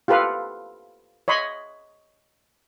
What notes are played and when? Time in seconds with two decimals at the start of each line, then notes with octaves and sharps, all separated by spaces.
0.08 F4 G4 A4 B4 F5
1.28 C#5 D#5 B5 C6